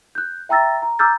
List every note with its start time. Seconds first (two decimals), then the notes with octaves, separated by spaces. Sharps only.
0.15 F#6 G6
0.49 E5 G5 A#5 E6 A6 A#6
0.82 A#5
0.99 A#5 D6 E6 F6 G6 A6